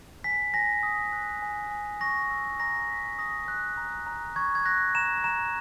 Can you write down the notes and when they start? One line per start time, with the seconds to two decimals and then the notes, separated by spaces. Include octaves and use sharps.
0.24 G#5 B6
0.54 G#5 A#6
0.83 D#6
1.13 F#6
1.42 G#5
1.71 G#5
2.01 C#6 A#6
2.31 E6
2.60 A#5 A#6
2.89 A#5 B6
3.18 D#6 A#6
3.48 F#6
3.77 A#5
4.07 A#5
4.36 C#6 G#6
4.55 G#6
4.65 F#6 A#6
4.95 A#5 E7
5.24 A#5 E7